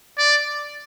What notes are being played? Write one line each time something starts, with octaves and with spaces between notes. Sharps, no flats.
D5